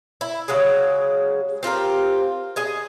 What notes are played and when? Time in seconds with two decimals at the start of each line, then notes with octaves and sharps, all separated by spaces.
0.21 E4
0.48 C#3 F#3 G#3 G#4
1.63 C4 F4 G4 A#4
2.56 G#4 D#5 G#5